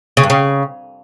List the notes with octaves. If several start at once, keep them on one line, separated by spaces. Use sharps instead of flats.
C#3
G2
C#3